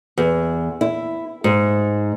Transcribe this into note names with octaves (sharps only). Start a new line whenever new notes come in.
E2
E4
G#2